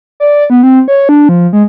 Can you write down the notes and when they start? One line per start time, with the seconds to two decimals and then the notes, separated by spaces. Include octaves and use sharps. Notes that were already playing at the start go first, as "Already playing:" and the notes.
0.20 D5
0.50 B3
0.63 C4
0.88 C#5
1.09 D4
1.29 F3
1.53 G#3